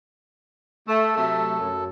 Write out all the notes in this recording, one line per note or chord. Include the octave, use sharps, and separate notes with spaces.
A3 A4
C3 F#3 A3
F#2